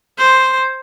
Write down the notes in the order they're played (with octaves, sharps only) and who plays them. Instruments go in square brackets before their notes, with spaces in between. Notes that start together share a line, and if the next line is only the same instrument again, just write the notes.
[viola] C5